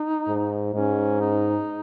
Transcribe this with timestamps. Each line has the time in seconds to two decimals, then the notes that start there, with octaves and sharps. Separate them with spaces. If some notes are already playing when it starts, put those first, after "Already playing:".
Already playing: D#4
0.28 G#2
0.74 G#2 C#4
1.21 D#4